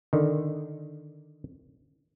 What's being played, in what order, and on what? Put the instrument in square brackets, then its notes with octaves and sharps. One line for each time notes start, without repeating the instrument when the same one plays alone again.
[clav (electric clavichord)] D3 D#3